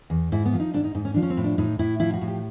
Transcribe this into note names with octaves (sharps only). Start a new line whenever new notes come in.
E2
G#2 E4
B3
F3
D#4
G#2 D4
D#4
G#2 D#4
C#4
F3 D4
C#4
C4
A2
D4
A2 D#4
A2 E4
F3 E4
F#4
A2
G4